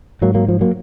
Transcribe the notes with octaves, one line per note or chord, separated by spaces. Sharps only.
G#2 F#3 A#3
F#3 A#3
F3
F#3 A#3